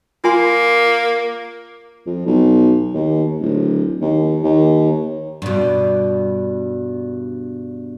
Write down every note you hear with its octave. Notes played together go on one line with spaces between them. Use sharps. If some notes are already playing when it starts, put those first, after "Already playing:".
A#3 F4 G#5 C6
F2
B1
D#2
D1
D#2
D#2
G2 B2